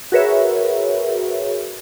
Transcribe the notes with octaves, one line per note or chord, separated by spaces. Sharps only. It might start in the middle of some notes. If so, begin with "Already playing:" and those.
F#4 G#4 A#4 B4 C#5 E5